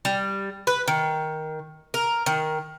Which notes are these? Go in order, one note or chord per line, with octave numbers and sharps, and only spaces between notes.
G3
B4
D#3
A#4
D#3